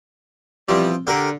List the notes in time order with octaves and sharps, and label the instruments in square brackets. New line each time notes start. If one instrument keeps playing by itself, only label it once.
[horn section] B2 E3 G3 [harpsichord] F3 C4
[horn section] D3 [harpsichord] G4 A#4